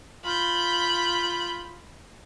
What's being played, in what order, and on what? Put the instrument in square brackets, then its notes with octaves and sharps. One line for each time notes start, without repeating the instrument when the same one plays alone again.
[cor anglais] F4 [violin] B5 G6